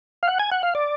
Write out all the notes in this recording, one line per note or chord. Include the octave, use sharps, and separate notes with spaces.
F5
F#5
G#5
F#5
F5
D5